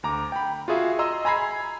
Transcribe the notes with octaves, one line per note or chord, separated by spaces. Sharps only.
D2 A#5 D6
G5 B5
F4 F#4 G#4 E5
D#5 A#5 C6 E6
G#5 A#5 B5 G#6 C7